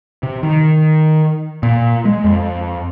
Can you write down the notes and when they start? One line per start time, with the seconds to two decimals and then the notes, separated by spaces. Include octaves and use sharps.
0.23 C3
0.43 D#3
1.63 A#2
2.05 G#3
2.24 F2